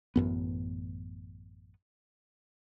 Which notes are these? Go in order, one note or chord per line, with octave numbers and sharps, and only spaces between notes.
A1 F#2 B3